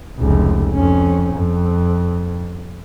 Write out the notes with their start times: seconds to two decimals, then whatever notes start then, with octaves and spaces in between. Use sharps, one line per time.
0.19 F1 C#2
0.74 F2 C#4
1.35 F2